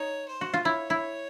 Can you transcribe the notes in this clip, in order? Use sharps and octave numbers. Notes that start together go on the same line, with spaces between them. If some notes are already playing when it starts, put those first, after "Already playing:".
Already playing: D#4 C#5
C5
F#4
F4
E4 C#5
E4